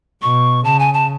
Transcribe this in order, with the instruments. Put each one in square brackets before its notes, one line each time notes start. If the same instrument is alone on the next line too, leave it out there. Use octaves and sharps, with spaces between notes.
[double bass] B2 [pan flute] C#6
[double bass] C#3 [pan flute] A5
[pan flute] G#5
A5